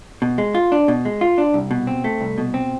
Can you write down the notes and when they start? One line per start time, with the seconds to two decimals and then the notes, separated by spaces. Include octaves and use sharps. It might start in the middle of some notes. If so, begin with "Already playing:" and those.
0.22 B2
0.38 G#3
0.55 F4
0.72 D4
0.88 B2
1.05 G#3
1.21 F4
1.38 D4
1.54 C2
1.71 B2
1.87 C4
2.04 A3
2.21 C2
2.38 B2
2.54 C4